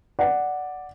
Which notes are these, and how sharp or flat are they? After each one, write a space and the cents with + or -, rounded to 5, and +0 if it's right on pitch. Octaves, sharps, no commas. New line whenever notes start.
D5 +0 F#5 +0